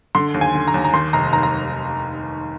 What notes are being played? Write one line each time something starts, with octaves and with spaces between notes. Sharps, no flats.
D3 C6
D#2
G#5
D3
A#5
D#2
A#5
D#3 C6
F1 A#5
D#3 A#5
A#5